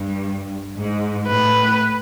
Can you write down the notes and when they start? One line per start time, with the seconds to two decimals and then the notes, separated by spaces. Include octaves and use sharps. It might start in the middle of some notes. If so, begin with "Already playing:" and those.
Already playing: G2
0.77 G#2
1.28 A2 B4